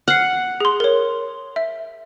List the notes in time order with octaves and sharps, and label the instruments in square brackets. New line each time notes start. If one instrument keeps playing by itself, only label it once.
[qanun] F#5 [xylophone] F6 C7
[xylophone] G#4 C6
A#4 C#5
E5